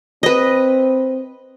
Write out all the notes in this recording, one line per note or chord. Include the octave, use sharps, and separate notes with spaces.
C4 B4 D#5